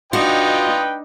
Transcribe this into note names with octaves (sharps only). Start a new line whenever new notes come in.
D4 D#4 F4 F#4 B4 D#5 G5